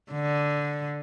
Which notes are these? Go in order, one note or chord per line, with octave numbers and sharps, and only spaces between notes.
D3